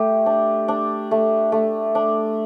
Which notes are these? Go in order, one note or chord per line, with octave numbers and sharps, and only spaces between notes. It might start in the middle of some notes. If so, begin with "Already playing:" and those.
Already playing: A3 G4
D4
D4
A3
A3
D4